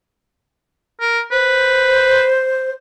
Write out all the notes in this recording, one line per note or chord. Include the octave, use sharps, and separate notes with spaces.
A#4
B4 C5